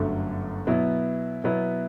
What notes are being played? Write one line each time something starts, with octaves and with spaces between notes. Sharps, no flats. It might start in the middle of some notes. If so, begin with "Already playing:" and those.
Already playing: G1 F#2 D3 F#3 A3
B2 F#3 B3 E4
B2 F#3 B3 E4